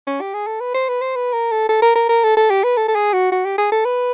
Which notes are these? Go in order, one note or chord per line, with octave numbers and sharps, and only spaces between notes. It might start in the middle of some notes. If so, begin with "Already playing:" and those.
C#4
G4
G#4
A4
B4
C5
B4
C5
B4
A#4
A4
A4
A#4
A#4
A#4
A4
A4
G4
B4
A4
A4
G#4
F#4
F#4
G4
G#4
A4
B4